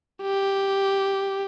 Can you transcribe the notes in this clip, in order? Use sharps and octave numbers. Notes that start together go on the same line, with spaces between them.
G4